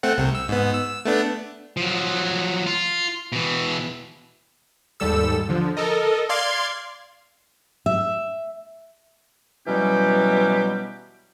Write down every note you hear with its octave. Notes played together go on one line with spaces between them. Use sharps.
A3 C4 F#5
C2 C3
E6
G#2 B3
E6
A3 B3 D4
F3 F#3
F4
B2 E3
D#2 G#2 G3 A4 E6
D3 F3
A4 A#4 D#5
D5 F5 C6 G#6
E5
B2 E3 F#3 G3 C#4 G4